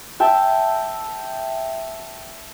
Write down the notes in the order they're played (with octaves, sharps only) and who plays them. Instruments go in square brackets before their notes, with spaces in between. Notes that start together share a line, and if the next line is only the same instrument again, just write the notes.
[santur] E5 G5 A5